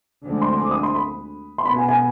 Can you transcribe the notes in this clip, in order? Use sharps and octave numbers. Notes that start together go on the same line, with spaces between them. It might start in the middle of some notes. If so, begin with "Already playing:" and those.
D2 D3 F3 G#3 C4
C6
D6
D#6
C6
B5
C6
B2 B3 B5
G#5
G#5